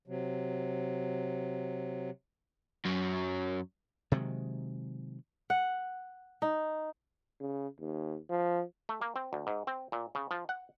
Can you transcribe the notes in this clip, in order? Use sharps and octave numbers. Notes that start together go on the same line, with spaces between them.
C3 F#3
F#2 F#3
C3 D#3 F#3 G#3
F#5
D#4
C#3
D#2
F3
A3
A#3
C4
D2
G#2
C4
A#2
C#3
F3
F#5